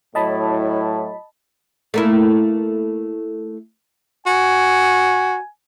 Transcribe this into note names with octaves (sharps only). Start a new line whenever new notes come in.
A2 F#3 E4 D#5 A5 B5
A3 A#3 E4
F#4 G#5